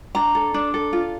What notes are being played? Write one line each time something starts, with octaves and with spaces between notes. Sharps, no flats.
D4 A#5
A4
D4
A4
F4